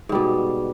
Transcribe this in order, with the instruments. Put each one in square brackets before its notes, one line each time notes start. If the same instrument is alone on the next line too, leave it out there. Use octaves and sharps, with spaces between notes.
[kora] G#2
G3
B2